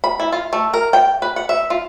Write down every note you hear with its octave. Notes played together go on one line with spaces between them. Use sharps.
B5
E4
F4
A3
A#4
G5
B4
F#5
E5
F4